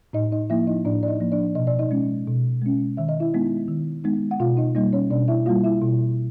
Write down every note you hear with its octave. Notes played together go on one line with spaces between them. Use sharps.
A2 D#4 D#5
D#4 D#5
F3 A#3 E4 E5
D#4 D#5
A2 D4 D5
D5
D#4 D#5
F3 A#3
D4 D5
B2 D#5
D5
D#4 D#5
G#3 C#4
B2
G#3 C#4
D#3 E5
D#5
E4 E5
G#3 B3 D#4
D#3
G#3 B3 D#4
F#5
B2 F4 F5
D#4 D#5
G3 A#3 D#4 D#5
C#4 C#5
B2 D4 D5
E4 E5
G3 A#3 F4 F5
E4 E5
B2